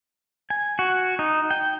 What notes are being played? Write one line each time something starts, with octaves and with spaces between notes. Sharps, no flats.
G#5
F#4
D#4
G5